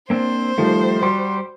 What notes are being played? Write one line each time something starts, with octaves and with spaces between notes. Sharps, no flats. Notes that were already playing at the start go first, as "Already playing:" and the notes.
A#3 C4 D4 C5
D#3 F3 G3 A3
G3 F#4 C6